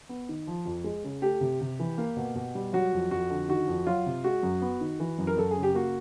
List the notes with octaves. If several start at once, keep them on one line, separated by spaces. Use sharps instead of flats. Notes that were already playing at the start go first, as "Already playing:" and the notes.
B3
D#3
F3
F2
G#3
C#3
A3 G4
C3
C3
E3
A#3
B2
B2
G3
F#3 F#4
F2
F2 F#4
D3
D#3 F#4
F2
F#3 F4
C3
G#3 F#4
F#2
B3
D#3
E3
F#2
A#4
F#2 A4
G#4
C#3
G4
A#3 F#4